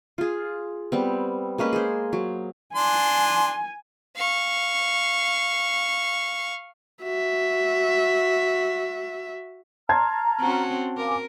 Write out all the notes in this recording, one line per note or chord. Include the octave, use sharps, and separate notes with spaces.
F4 G#4
G3 B3 C4
G#3 A#3 C#4 B4
G#4 C5
F#3
D4 G#5 C6
F5 C#6
F#4 E5
A5 A#5 C6 F6 G#6
C4 C#4 F#4
A#4 F5 G#5 D6